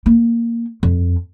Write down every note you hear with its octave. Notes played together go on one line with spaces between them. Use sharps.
A#3
F2